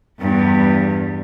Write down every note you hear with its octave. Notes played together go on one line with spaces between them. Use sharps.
E2 G2